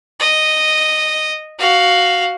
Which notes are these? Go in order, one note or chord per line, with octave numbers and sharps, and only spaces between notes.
D#5
F#4 F5